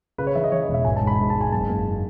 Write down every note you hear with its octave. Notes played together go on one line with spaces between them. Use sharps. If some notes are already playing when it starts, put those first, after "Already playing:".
C#3 B4
C#5
E3 E5
D#5
E3 C#5
D#5
E1
E5
G#1 G#5
A5
G#2
B5
G#2
A5
G#2
G#5
F#1 A5
F#1